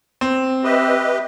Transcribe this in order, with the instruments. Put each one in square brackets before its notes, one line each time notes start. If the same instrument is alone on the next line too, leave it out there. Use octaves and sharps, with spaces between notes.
[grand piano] C4
[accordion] G4 B4 D#5 [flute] E5